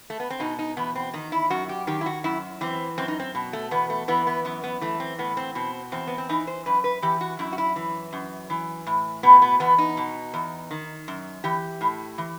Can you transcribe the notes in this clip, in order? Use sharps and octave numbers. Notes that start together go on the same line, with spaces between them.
A3
B3
C4
B2 D#4
D#4
E2 B3
C4
D#3 D#4
E4
F#2 F#4
G4
D#3 G4
E4
F#4
F#2 E4
E3 C4
F#2 C4
D#4
C4
B2
A3
E2 B3
A3
E3 B3
B3
F#2 B3
B3
E3 A3
C4
A2 B3
C4
B2 C4
E2 C4
B3
C4
E3 D#4
C5
F#2 B4
B4
E3 G4
F#4
F#2 E4
F#4
E4
E3
F#2
E3
A2
B2 B3
B3
E2 B3
D#4
B2
E2
D#3
F#2
E3 G4
A2
E3